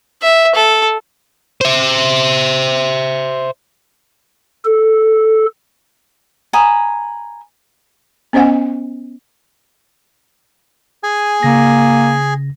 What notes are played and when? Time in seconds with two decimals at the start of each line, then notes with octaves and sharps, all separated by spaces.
0.22 E5
0.55 A4
1.61 C5 E5
4.65 A4
6.53 G#5 A#5 B5 D#6
8.33 B3 C#4 C5 D#5 F#5 G#5
11.03 G#4 G#5
11.43 C#3 A#3 A#6